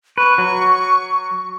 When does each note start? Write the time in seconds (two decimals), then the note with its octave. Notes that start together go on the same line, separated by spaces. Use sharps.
0.18 B4 C#6
0.38 F#3